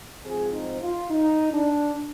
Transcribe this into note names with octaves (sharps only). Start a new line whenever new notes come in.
G#2 F3 C4 G#4
D#4
F4
D#4
D4